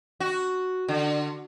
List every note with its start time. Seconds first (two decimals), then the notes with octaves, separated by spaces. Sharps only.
0.20 F#4
0.88 D3